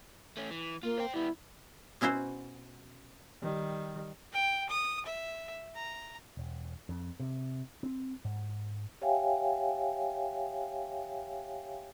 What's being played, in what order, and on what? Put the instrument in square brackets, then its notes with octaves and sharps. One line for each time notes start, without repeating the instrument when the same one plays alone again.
[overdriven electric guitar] A3 C#4
E3
[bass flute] A#3 [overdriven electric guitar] F4
[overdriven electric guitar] C5 G5
[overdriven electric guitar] G3 B3 [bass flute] E4
[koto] B2 C#4 E4 F#4 C5
[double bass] D#3 G3
[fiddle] G5
D#6
E5
A#5
[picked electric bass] E1
F2
C3
C4
G#2
[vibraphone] G4 C#5 E5 F5 G5 G#5